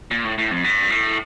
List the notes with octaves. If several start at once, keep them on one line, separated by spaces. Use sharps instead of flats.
A#2
A2
A2
F2
G2
A2